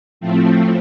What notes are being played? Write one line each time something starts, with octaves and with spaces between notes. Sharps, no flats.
A2 F3 A3 C4